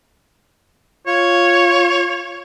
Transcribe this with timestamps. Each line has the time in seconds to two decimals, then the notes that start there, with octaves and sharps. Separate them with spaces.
1.07 F4 C#5